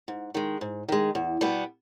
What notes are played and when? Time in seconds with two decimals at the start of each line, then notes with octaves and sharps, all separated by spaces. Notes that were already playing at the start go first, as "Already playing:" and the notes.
0.08 G#2
0.34 D#3 G#3
0.61 G#2
0.88 D#3 G#3
1.15 E2
1.41 B2 G3 B3